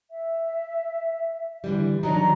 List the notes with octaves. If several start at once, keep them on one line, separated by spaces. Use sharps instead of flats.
E5
D3 E3 G3
D#3 F#3 D4 F#4 A#5